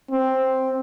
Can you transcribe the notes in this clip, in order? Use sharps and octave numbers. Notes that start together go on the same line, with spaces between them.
C4